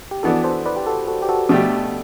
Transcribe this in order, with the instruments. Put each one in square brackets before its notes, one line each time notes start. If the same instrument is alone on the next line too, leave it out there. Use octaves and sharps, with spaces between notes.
[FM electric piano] G4
[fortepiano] E3 B3 D4 [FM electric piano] F#4 A4
[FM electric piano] A4 C5
B4 D5
G4
F#4 A4
F#4 A4
G4
F#4 A4
[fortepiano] B2 A3 D4 G4 [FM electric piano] F#4 A4